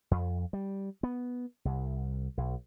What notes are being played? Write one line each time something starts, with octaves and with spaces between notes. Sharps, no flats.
F2
G3
B3
C2
B1